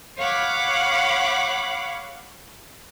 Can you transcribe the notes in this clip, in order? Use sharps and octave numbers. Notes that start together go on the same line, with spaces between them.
C#5 F5 F#5 B5 D6